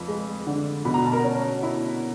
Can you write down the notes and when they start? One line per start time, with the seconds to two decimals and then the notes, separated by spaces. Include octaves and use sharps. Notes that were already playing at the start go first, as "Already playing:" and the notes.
Already playing: F2 F3 B4 B5
0.08 G#3
0.47 D3
0.85 B2 B5
0.94 A#5
1.04 A5
1.12 A#4 A#5
1.24 C#4
1.63 E4